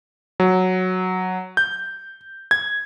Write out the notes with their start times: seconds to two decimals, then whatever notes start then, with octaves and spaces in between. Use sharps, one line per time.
0.40 F#3
1.57 G6
2.51 G#6